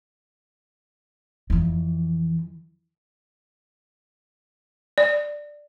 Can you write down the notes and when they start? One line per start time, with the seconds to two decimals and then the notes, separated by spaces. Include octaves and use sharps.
1.50 F2 E3
4.98 D5